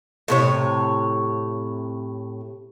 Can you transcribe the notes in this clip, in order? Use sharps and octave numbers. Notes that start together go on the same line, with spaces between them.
A2 C3 C#5